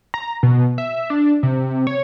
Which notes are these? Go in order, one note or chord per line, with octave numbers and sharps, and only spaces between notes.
A#5
B2
E5
D4
C3
C#5